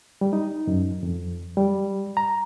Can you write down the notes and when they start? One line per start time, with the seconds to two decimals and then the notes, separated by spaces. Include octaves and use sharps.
0.21 G3
0.33 D#4
0.67 F#2
1.03 F2
1.57 G3
2.17 A#5